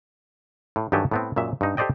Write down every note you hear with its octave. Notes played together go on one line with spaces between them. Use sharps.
A2
G2 D#3 F#3 G4 A4 G#5
A2 B3 C4
F#2 A#2 G#3 E5
G2 D#4
G4 A4 C5 D5 D#5 G5